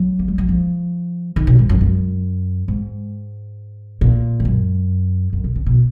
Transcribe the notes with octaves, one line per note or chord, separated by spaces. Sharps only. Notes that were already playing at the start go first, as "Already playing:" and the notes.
Already playing: F#3
A#3
G#3
F#3
F3
D#3
B2
G#2
F#2
F#2
G#2
A#2
G#2
F#2
F#2
B2
C#3
B2